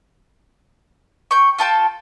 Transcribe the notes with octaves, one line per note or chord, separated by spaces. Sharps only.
G5 C#6
F4 A4 G5 A5